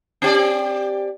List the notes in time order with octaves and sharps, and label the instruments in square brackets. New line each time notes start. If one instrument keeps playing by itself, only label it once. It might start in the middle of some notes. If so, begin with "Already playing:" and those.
[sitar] C4 G4 D5